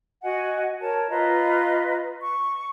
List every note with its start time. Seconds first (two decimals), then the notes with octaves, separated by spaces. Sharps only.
0.23 F#4 D#5 F#5 G#5
0.81 A#4 C#5 A5
1.09 F4 B4 D#5 A#5
2.21 C#6